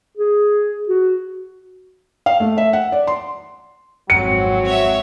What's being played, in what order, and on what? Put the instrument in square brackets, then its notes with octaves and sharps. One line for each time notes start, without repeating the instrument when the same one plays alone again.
[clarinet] G#4
F#4
[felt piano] F5
A3
E5
F#5
D5
C6
[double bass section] G#1 F2 C4 [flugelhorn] F#3 [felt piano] C#7
[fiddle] C#5 E5